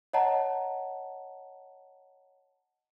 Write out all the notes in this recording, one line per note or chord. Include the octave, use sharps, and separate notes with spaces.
C#5 D#5 F#5 A5 A#5